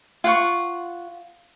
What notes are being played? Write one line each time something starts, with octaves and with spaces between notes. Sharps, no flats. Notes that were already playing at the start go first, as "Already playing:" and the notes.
F4 F#5 G5 C#6